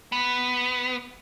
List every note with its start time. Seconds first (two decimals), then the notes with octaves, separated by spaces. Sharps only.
0.12 B3